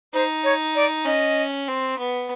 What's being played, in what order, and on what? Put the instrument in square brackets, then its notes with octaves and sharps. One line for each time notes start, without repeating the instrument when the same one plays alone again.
[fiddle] D#4 [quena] C5
[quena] C#5
D5
[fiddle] C#4 [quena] D#5
[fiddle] C4
B3